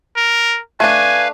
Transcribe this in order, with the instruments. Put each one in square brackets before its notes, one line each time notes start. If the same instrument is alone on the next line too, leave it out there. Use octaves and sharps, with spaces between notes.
[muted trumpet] A#4
[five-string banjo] A3 D4 [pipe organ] B4 F5 [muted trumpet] G#5